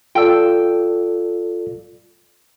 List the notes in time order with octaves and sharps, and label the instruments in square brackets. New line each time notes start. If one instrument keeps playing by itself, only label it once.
[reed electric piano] F4 A4 D5 [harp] G5 E6